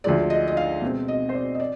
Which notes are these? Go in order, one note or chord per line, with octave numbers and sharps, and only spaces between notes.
D2 D3 F3 G#3 D5
D#5
D#5
F5
B2 G#3 C4
D#5
C5
D5
D#5
D5